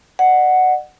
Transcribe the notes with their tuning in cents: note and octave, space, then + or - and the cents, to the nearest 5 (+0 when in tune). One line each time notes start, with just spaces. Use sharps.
D5 +40 F#5 +0